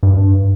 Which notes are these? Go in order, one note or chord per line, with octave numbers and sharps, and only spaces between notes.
G2